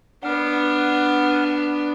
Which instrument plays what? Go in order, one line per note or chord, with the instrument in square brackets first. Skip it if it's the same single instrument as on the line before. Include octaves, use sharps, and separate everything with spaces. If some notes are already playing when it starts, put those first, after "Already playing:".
[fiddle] B3 D4 [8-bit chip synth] F#5 F6